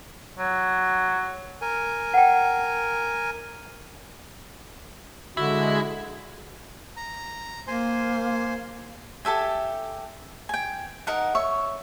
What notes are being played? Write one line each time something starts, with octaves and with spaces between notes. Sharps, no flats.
F#3
A#4 G#5
F#5 G5
D3 G#3 E4 F#4
A#5
A#3 C5 G#5 C6
G4 A4 E5 G#5
G5 G#5
D#4 A#4 F#5
C#5 E5 C#6